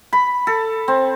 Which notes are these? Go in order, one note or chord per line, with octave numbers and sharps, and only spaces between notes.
B5
A4
C4